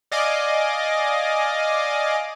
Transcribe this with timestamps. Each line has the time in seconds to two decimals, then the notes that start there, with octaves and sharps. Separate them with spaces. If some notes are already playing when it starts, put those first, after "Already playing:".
0.12 D5 D#5 F5 G#5 D6